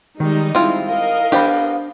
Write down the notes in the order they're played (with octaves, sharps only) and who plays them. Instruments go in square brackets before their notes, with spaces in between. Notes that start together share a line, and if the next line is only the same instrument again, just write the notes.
[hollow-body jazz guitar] D#3 [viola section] G3 G#3 D#4
[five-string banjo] C4 F4 [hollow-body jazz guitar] E4
[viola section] A#4 D#5 [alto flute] F5
[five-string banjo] B3 G4 [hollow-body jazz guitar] D4 C5 B5